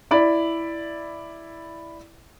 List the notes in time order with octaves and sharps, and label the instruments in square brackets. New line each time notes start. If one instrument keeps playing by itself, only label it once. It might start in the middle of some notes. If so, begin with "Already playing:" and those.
[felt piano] E4 D5 B5